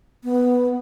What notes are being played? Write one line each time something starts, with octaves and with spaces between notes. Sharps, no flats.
B3